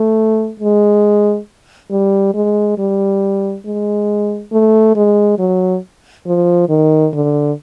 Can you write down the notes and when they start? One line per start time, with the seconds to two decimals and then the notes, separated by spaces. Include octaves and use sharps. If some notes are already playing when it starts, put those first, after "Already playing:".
Already playing: A3
0.60 G#3
1.91 G3
2.34 G#3
2.78 G3
3.66 G#3
4.52 A3
4.96 G#3
5.39 F#3
6.27 F3
6.69 D#3
7.13 D3